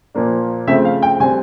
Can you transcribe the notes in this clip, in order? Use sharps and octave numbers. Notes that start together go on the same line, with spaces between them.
A#2 F3 A#3 D4
C#3 F3 A3 C4 E5
F5
G5
D3 G3 C4 G#5